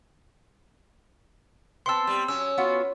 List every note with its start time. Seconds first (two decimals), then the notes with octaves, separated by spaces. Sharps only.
1.86 B3 C4 A5 C6 E6
2.07 G3
2.28 F#3 C#4 E6
2.58 B3 F4 F#4